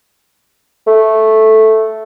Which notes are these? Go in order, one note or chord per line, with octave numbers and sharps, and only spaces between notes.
A3